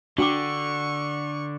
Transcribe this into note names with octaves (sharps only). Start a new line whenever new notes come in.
D3 D4 F#4 G5 C#6 D6